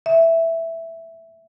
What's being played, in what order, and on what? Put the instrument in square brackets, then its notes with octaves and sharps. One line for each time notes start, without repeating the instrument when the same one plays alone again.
[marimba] E5